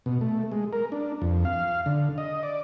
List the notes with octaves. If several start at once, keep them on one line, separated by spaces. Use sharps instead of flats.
B2
A3
G#3
A#4
D4
F2
F5
D3
D#5
D5